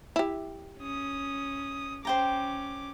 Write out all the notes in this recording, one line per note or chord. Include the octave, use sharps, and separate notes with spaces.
E4 G4
C#4 D#6
C#4 C5 G5 A#5 D6